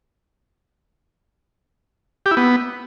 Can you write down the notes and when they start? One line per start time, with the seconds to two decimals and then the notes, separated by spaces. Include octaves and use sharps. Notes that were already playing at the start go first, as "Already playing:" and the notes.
2.26 G4
2.31 E4
2.37 B3